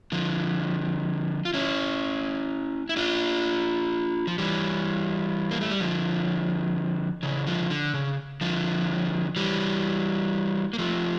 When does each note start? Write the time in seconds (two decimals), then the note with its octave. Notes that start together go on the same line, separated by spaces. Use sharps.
0.12 D3 F3
1.45 F4
1.54 C#4 E4
2.89 E4
2.96 D4 F4
4.27 F3
4.38 E3 G3
5.51 A#3
5.61 A3
5.71 G3
5.80 D3 F3
7.23 C#3 E3
7.47 D3 F3
7.70 D3
7.94 C#3
8.41 D3 F3
9.36 E3 G3
10.73 A#3
10.78 F3 A3